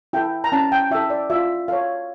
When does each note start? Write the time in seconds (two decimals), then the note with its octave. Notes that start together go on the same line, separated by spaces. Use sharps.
0.13 E4 A4 G5
0.44 A#5
0.52 C#4 A5
0.72 G5
0.91 E4 A4 E5
1.10 D5
1.30 F4 E5
1.68 A4 C#5 F5